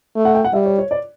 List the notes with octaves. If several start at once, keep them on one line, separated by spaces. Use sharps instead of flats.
A3
F#5
G5
F#5
G3 E5
C#5
C#5
D5